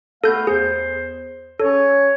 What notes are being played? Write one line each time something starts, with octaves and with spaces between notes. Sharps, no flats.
A3 B3 A4 F5 G6
E2 G#4 C5
C#4 A4 C#5